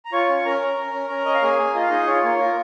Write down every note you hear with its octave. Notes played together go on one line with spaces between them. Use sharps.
A#5
F4 C#5 C#6
C#4
C#4 A#4 A#5
C#4
C#4
C#4
C#4
C#4 D#5
F5
A#3 G#4 G#5
A#3
F4 D#5
F5
D#4 G#4 D#5
F4 C#5
A#3 C#5
F4 A#4